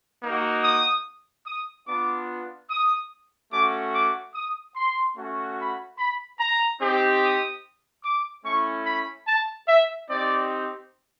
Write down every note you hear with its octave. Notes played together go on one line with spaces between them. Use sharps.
A#3 D#4 F#4
D#6
D#6
B3 D4 F4 D6
D#6
A3 C#4 F#4 D6
D6
D#6
C6
A3 C#4 F#4
B5
B5
A#5
C4 D#4 G4
D#6
D6
A3 C#4 E4 C#6
B5
A5
E5
C4 D#4 G4 D5